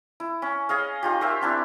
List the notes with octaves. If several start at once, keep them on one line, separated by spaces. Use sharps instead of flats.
E4
C#4
G#4 C#5 D#5 F5
D#4 F4 G4
G4 A#4 E5 F5
C4 D4 E4